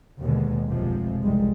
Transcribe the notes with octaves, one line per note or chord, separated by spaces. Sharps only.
D#2 B2 D3 G#3
F1 B1 C3 F3 G#3
F1 C2 G3 G#3